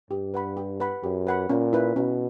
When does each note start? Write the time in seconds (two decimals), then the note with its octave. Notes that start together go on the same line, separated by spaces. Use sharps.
0.11 G2 G4
0.34 B4 F#5 B5
0.57 G4
0.80 B4 F#5 B5
1.03 F#2 G4
1.27 B4 F#5 B5
1.49 A#2 C#4
1.73 E4 B4
1.96 B2 C#4